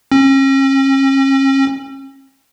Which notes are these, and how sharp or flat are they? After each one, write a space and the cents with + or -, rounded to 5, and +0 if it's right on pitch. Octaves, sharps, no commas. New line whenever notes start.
C#4 -40